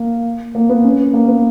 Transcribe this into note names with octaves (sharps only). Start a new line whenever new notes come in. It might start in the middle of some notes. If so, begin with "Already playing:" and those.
Already playing: A#3
A#3
B3
C#4
A#3
B3